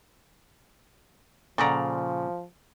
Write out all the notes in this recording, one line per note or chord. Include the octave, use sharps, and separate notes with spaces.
A#2 C#3 F3 A4 D5 F#5 A#5